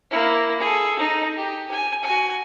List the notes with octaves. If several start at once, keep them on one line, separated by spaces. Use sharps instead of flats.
A#3 E4
G#4 A4
D#4
G4
G#5
F#4 G#5